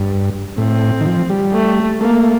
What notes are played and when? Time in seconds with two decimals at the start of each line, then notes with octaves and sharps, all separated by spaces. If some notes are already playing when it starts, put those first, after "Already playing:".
Already playing: G2
0.58 A2 C4
1.01 D#3
1.06 F3
1.30 G3
1.53 A3
2.01 A3 A#3